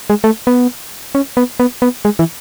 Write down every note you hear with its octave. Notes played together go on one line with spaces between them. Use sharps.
G#3
A3
B3
C#4
B3
B3
B3
G#3
E3